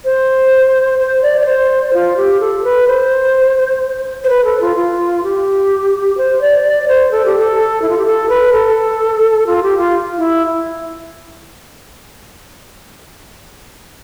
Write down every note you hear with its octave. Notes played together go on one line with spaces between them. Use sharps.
C5
C5
D5
D5
C5
F4
G4
A4
B4
C5
C5
B4
A4
F4
F4
G4
C5
D5
D5
C5
A4
G4
A4
E4
F4
G4
A4
B4
A4
F4
G4
F4
E4